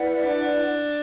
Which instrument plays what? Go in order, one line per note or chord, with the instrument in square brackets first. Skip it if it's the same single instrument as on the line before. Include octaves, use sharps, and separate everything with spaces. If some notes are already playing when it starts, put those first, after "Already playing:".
Already playing: [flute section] E4 B4 D5 F#5
[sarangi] D4